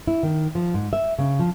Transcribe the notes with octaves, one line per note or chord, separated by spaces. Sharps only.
E4
D#3
F3
G#2
E5
C#3
F3